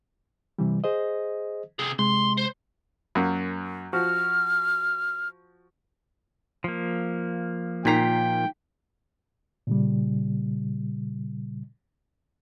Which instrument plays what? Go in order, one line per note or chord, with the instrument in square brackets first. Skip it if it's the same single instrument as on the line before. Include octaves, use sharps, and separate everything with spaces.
[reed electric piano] C3 E3 G3
G#4 C5 D#5
[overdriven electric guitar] C3 G#4
[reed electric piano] C3 G#3 [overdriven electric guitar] C6
[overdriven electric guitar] C5
[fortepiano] F#2 F#3 A#3
[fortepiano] F3 F#4 [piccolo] F6
[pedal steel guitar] F3 A#3
[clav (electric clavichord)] A#2 A#5 [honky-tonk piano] D#3 B6 C7 [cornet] G5
[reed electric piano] A#2 C#3 G3